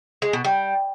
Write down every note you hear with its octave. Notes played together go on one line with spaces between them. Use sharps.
G#3
B2
G3